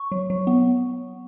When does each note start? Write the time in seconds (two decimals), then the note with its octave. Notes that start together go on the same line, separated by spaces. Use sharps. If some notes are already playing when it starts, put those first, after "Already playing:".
Already playing: C#6
0.12 F#3
0.30 F#3
0.47 B3